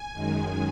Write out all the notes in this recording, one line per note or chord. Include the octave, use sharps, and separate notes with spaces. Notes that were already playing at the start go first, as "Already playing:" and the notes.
Already playing: G#5
F#2 D#3 G#3